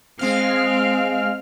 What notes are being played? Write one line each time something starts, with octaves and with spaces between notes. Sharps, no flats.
G#3 C4 F5 F6